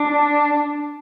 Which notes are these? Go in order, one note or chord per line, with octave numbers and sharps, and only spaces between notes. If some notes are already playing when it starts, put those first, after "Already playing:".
Already playing: D4